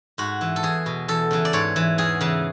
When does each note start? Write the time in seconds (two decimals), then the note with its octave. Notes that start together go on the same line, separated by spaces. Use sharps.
0.18 G#2 F#4
0.41 E3
0.56 A4
0.63 E2 G#4
0.86 B2
1.08 E2 A4
1.31 C#3 E3
1.45 D5
1.53 G#2 C#5
1.76 E3
1.98 E2 G#4
2.21 C#3 E3